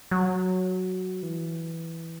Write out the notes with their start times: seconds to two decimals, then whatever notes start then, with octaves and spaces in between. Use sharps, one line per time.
0.11 F#3
1.23 E3